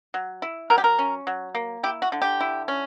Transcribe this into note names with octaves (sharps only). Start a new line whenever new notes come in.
F#3
E4
F#3 A#4
G4
A#4
C#4
F#3
A#3
E4 G4
F#4
D3
G4
E4
C#4